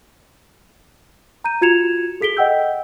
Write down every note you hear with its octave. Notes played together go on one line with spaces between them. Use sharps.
A#5 G6 D#7
F4 F#4 G#6 C#7 E7 F7
G#4 A4 B6 D7 G7
D#5 F#5 G5 E6 G6